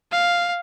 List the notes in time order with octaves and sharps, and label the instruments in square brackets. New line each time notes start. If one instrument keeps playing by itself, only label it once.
[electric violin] F5